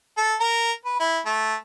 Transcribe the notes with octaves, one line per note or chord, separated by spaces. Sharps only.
A4
A#4
B4
E4
A3